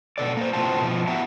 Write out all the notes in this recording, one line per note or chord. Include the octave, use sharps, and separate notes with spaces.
B2 A4 D5
A#3 C5
A2 C3 F4 F#4 C5 A5
B2 F3
B3 E4 F#4 G4 E5 A#5